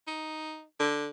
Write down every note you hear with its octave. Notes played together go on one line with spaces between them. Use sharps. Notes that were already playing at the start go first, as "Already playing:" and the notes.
D#4
D3